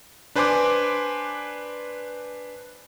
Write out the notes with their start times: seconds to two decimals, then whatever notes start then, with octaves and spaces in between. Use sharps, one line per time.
0.35 D4 B4 C5 G#5 C6 D6